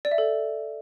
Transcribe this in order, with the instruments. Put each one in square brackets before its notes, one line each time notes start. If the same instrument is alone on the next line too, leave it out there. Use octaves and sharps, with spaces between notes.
[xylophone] D5
E5
A4